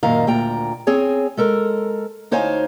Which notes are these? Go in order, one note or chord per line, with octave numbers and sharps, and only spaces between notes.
F#2 A#2 D#3 D#5 F5 A#5
D2 A#2 G5 A#5
C4 G#4 C#5 G#5
G#3 A4 A#4
D2 D#4 C5 C#5 F5 G#5